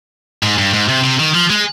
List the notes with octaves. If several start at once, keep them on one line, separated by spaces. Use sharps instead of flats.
G#2
G2
G#2
C3
C3
D#3
F3
G#3